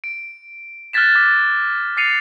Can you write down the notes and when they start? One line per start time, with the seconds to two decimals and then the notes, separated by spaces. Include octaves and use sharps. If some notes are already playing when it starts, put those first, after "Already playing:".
0.04 D7
0.93 F6 F#6 G#6 A6 B6 E7
1.15 D6 G#6 B6
1.97 D6 A6 C7 C#7 D#7 F7